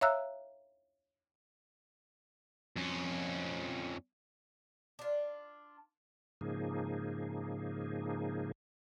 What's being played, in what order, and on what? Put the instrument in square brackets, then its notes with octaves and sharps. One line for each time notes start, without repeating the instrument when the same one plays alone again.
[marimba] C#5 E5 F5 A#5 E6 F#6
[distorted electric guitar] F2 C#4
[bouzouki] D4 F4
[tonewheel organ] G#2 C#3 F3 A#3 D#4 G#4